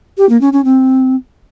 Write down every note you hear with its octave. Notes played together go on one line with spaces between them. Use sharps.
G4
A#3
C#4
C#4
C4